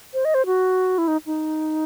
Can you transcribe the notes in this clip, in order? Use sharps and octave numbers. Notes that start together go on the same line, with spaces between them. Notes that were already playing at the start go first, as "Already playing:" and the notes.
C5
D#5
C5
F#4
E4
D#4
D#4